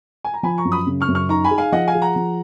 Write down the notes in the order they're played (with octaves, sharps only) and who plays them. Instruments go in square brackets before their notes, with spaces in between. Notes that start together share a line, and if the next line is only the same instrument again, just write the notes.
[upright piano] G#5
A#5
[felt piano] F3 [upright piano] G#5 B5
[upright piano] A#5 C#6
[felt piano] F#2
[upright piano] B5 D#6
[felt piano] C#3
[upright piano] C#6 F6
[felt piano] F#2
[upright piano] C#6 F6
[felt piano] D#4 [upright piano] A#5 C#6
[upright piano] G#5 B5
[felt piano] G#4
[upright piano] F5 G#5
[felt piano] F3 [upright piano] D#5 F#5
[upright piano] F5 G#5
[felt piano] G#4
[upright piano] F#5 A#5
[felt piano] F3